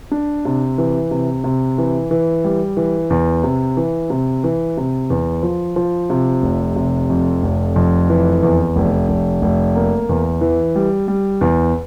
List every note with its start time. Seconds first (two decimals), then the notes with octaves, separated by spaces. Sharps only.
0.11 D4
0.45 C3
0.78 E3
1.11 C3
1.44 C3
1.78 E3
2.11 E3
2.44 G3
2.77 E3
3.10 E2
3.43 C3
3.77 E3
4.10 C3
4.44 E3
4.77 C3
5.10 E2
5.43 F3
5.76 F3
6.10 C3
6.43 F1
6.76 C3
7.10 F2
7.43 F1
7.76 F2
8.10 E3
8.43 E2
8.76 F1
9.09 F1
9.42 F1
9.76 A#3
10.09 E2
10.41 E3
10.76 G3
11.08 G3
11.41 E2